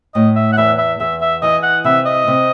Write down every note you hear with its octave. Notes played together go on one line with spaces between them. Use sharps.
A2 D#5
E5
F#5
E2 E5
E5
E2 E5
E5
E3 D#5
F#5
C3 E5
D#5
C3